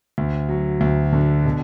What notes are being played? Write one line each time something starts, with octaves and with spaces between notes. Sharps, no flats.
D2
F#3
D2
D3
B2